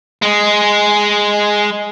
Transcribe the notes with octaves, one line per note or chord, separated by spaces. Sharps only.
G#3 G#4